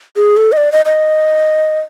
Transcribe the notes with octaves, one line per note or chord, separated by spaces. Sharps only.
G#4
A4
D#5
D5
D#5
D#5